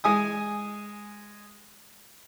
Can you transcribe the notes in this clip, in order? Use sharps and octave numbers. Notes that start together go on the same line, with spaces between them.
G#3 G#5 D#6